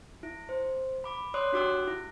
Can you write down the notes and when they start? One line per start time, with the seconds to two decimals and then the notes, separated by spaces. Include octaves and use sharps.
0.23 E4
0.49 C5
1.04 B5 D6
1.34 C#5 D5 C6 D6 D#6 F#6
1.52 D4 F#4 G4 D6 E6 F#6
1.87 E4